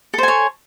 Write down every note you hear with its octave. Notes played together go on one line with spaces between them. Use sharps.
A4 C5 C#5 G#5